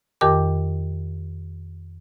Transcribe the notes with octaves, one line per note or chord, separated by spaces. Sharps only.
F2 D#3 G4 A#4 G5 D6